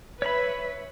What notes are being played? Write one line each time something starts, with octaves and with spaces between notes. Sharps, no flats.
B4 C#5 E5 B5